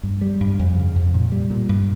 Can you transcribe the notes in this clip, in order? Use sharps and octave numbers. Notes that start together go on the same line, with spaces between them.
G2
G3
G2
F2
C#3
F2
A#2
G3
A#2
G2